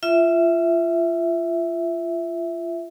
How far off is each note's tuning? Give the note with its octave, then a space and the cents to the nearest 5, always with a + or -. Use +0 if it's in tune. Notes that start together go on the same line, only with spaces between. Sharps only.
F4 -25 E5 +0